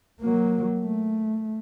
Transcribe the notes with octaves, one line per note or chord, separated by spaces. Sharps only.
F#3 A#3
A3